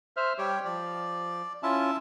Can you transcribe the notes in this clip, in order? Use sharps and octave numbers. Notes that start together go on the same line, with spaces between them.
C5 E5 F6
G3 G4 C#5 G5
F3 D5
C#4 E4 F4 E5 A5